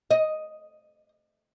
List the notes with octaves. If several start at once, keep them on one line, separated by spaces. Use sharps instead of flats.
D#5